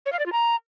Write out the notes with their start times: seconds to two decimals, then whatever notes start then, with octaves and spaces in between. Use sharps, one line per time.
0.06 C#5
0.12 F5
0.19 D5
0.26 F4
0.32 A#5